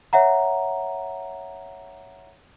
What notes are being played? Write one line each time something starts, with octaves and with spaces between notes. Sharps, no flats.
C#5 E5 F#5 A#5